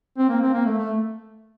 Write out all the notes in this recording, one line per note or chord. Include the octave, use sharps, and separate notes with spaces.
C4
A#3
C4
A#3
A3
A3